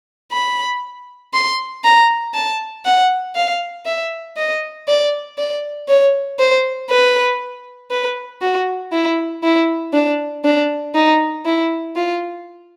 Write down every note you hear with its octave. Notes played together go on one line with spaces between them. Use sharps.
B5
C6
A#5
A5
F#5
F5
E5
D#5
D5
D5
C#5
C5
B4
B4
F#4
E4
E4
D4
D4
D#4
E4
F4